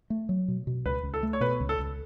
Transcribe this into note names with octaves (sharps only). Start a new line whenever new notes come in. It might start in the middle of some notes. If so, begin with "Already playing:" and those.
A3
F#3
B2
B2
C#2 B4
C#2
A4
A3
C#5
B2 B4
C#2
A4
C#2